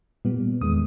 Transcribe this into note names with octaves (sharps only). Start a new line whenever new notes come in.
A#2 G3 B3
E2 D#3 G#3 B3 D#6